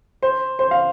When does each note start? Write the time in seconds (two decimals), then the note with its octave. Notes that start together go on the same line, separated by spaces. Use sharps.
0.23 C5
0.59 C5
0.71 F5